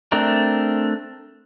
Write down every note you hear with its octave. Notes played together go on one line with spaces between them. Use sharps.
A3 C4 D4 A#4